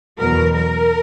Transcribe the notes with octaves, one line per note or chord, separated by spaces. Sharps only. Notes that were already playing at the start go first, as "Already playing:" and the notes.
E2 B2 F#3 A#4
A#4